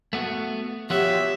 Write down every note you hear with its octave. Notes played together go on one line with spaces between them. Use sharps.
A3 B3 F#4
F3 B3 F#4 G4 C#5 E5